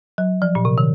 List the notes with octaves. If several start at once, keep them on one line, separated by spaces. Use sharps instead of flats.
F#3
F3
A#2
C3
D#3